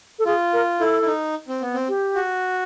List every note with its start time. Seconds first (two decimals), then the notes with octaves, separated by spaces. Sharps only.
0.19 A4
0.25 F4 G#4
0.53 A#4
0.80 E4 A4
1.02 E4
1.07 D#4
1.48 C4
1.62 B3
1.74 C4
1.89 G4
2.15 F#4